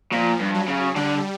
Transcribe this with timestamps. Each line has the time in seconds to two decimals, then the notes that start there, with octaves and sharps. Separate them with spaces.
0.12 A#2 F3
0.40 G2
0.54 F#3
0.68 C#3
0.96 D3 G3